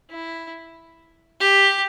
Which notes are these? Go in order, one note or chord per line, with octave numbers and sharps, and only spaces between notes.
E4
G4